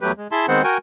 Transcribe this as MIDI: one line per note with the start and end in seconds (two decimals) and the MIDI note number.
0.01 0.12 40
0.01 0.12 54
0.01 0.12 57
0.01 0.12 67
0.01 0.12 71
0.18 0.27 56
0.32 0.46 64
0.32 0.46 68
0.32 0.46 76
0.32 0.46 81
0.32 0.46 84
0.48 0.62 51
0.48 0.62 56
0.48 0.62 59
0.48 0.62 60
0.48 0.62 72
0.48 0.62 78
0.64 0.78 66
0.64 0.78 70
0.64 0.78 79
0.64 0.78 80